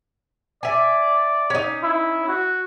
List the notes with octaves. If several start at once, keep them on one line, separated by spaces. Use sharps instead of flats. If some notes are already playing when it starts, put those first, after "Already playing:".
D5 E5 G#5
C#4 D#4
E4
F#4